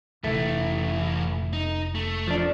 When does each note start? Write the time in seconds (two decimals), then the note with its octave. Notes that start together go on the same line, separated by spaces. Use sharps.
0.24 F1 A2 E3 A3
1.53 D#4
1.95 A3
2.28 F3 D4